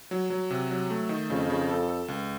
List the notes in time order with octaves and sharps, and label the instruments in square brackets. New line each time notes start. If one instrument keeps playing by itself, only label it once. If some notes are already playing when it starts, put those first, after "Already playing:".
[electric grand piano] F#3
F#3
C3
F#3
A3
D#3
[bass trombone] F2 [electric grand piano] C#3
[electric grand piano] C#3
A4
A4
C#2